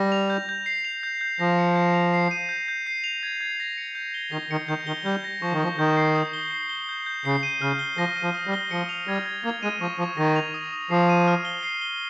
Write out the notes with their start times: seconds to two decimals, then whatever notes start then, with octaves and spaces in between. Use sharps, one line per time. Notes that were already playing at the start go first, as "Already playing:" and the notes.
Already playing: G3 A#6
0.12 F7
0.30 G6
0.49 G6
0.66 C7
0.85 F7
1.03 G6
1.21 G6
1.40 F3 A#6
1.59 C#7
1.76 G6
1.94 F7
2.14 C7
2.31 D#7
2.49 G6
2.68 G6
2.86 C7
3.04 F7
3.23 G#6
3.41 G#6
3.60 A#6
3.78 C#7
3.95 G6
4.14 G7
4.32 D#3 A#6
4.51 D#3 C#7
4.68 D#3 G6
4.87 D#3 G7
5.05 G3 G6
5.24 A#6
5.42 F3 C#6
5.52 D#3
5.60 F3 C#6
5.79 D#3 G6
5.97 C7
6.15 D#6
6.33 G7
6.51 C7
6.69 G7
6.89 G6
7.06 G6
7.25 C#3 C7
7.43 D#7
7.61 C#3 F6
7.79 G7
7.97 F3 A#6
8.16 D#7
8.23 F3
8.34 D#6
8.47 G3
8.53 G7
8.71 F3 C#7
8.89 F7
9.07 G3 G#6
9.26 G#6
9.44 A#3 G#6
9.63 G#3 D#7
9.81 F3 C#6
9.98 F3 C#6
10.17 D#3 A#6
10.36 F7
10.54 D#6
10.73 D#6
10.91 F3 C7
11.09 D#7
11.28 F6
11.45 G7
11.63 C7
11.81 G7